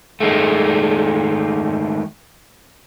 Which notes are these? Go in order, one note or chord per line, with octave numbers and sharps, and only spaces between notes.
D#3 G#3 A3